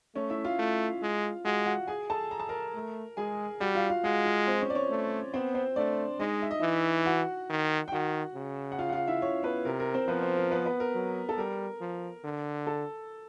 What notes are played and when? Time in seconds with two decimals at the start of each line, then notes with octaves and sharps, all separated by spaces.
0.15 A3 C#4 C#5
0.30 E4 E5
0.44 F4 F5
0.59 A3
1.02 G#3
1.45 G#3 F#4 F#5
1.66 F#4 F#5
1.87 G#4 G#5
2.10 A4 A5
2.31 A#5
2.39 A5
2.49 A#4 A#5
2.74 A3
3.17 G#3 G#4 G#5
3.60 G3 F#4 F#5
3.75 F4 F5
3.90 F4 F5
4.04 G#3 F#4 F#5
4.25 F4 F5
4.47 C4 C5
4.61 C#4 C#5
4.70 D5
4.75 C#4 C#5
4.90 A3
5.33 B3 C4 C5
5.55 C4 C5
5.76 A3 D4 D5
6.20 G#3 D#4 D#5
6.42 E5
6.51 D#5
6.60 E3 E4 E5
7.06 F#4 F#5
7.50 D#3
7.88 G5
7.92 D#3 F#4 F#5
8.35 C#3
8.72 F#5
8.79 F4 F5
8.89 F#5
8.93 F4 F5
9.07 E4 E5
9.22 C#4 C#5
9.43 B3 B4
9.65 C3 A#4
9.80 A#4
9.94 C4 C5
10.08 F3 B3 B4
10.22 C4 C5
10.37 A#4
10.51 B3 B4
10.65 B3 B4
10.80 A#4
10.95 F#3
11.29 A4
11.38 G3 A#4
11.81 F3
12.24 D3
12.67 A4